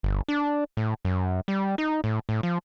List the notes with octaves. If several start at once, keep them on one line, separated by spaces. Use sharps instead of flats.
G1
D4
A2
F#2
G3
D#4
A2
A2
F3